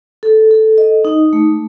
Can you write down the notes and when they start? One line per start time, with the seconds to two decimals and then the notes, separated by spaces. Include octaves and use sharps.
0.23 A4
0.51 A4
0.78 D#5
1.05 D#4
1.33 A3